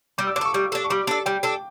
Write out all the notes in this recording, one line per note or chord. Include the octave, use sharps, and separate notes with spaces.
G3 D6
E6
D4 D6
A4 C#6
G3 D6
D4 A4
C#6
G3 D6
D4 A4
G3 G5
D4 A4